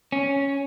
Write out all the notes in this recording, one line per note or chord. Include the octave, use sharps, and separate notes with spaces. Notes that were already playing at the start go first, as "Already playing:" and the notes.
C#4